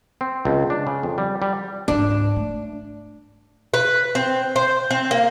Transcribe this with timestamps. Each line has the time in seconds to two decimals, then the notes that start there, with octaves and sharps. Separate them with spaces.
0.21 C4
0.45 C#2
0.70 D4
0.87 C#3
1.03 F2
1.18 G3
1.42 G3
1.88 C#2 G#2 D4
2.36 A3
3.74 B4
4.15 C4
4.56 C5
4.91 C4
5.11 A#3